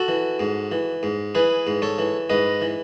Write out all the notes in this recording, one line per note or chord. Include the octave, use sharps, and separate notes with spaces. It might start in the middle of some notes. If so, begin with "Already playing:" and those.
Already playing: F#4 A4
E3
G#2
E3
G#2
E3 G#4 B4
G#2
A4 C#5
E3
G#2 B4 D#5
E3